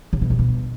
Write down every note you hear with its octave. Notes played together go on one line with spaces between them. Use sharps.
C#3
B2
G3
B2